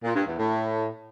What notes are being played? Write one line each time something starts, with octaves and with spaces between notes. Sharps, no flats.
A#2
G2
E2
A2